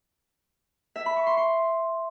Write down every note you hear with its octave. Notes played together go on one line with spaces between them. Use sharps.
E5
B5
C#6
C6
C6